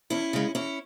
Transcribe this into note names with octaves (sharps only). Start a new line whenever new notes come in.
E2 C#4 E4
C#3 G#3
E2 C#4 E4